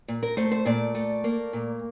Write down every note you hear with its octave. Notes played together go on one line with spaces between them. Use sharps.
A#2
A#4
A3 C5
C5
A#2 D5
A3
A#3
A#2